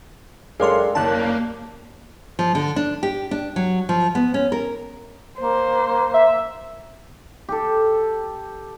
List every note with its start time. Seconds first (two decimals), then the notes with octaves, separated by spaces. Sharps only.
0.60 F#2 G3 G#3 D4 A4 A#4 F5 C6
0.95 F#1 A#3 C#4 A5 F#6
2.39 F3
2.55 D3
2.76 D4
3.03 G4
3.31 D4
3.56 F#3
3.89 F3
4.15 B3
4.34 C#4
4.52 A#4
5.39 A#3 C5
6.14 E5
7.49 G4 A4